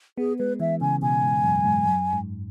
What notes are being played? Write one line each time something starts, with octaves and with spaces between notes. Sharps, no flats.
B3 G#4
G#3 B4
E3 E5
C#3 G#5
B2 G#5
G#2
F#2
G#2
F#2
G#2